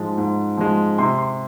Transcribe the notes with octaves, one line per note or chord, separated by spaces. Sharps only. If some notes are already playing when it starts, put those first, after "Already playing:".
Already playing: G#2 F3 G#3
G#2
F3 G#3
C3 C6
C6